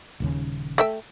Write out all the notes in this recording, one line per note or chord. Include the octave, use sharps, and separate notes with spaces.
D#1 D#2 C#3
A3 E5 G5